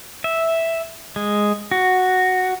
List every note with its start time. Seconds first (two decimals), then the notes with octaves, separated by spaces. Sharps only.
0.24 E5
1.16 G#3
1.71 F#4